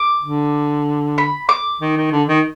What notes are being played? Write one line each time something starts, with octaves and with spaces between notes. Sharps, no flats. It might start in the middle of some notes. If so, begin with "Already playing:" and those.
Already playing: D6
D3
B5
D6
D#3
D#3
D3
D#3